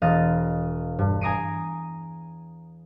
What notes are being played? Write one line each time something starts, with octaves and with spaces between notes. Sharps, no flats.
E1 D#5 F5 A6 D#7
G2
G#5 A#5 D#6 C7 D7 D#7